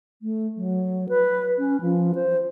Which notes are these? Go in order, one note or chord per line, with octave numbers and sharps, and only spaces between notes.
A3
F#3
B4
C#4
F3
C5